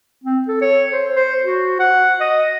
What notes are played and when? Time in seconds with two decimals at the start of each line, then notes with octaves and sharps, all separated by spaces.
0.24 C4
0.48 A4
0.61 C#5
0.92 C5
1.16 C5
1.43 F#4
1.79 F#5
2.20 D#5